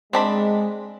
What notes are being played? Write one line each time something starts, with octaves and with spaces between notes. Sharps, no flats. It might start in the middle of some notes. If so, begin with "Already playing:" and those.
G#3 C4 D4 B5